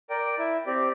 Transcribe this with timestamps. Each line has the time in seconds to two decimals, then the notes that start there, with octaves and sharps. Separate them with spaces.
0.10 A#4 D5 G5
0.38 E4
0.67 C4 G4 D5